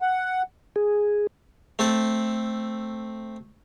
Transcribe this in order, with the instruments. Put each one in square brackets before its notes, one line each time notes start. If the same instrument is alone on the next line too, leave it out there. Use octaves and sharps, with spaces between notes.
[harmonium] F#5
[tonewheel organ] G#4
[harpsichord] A3 C4 A4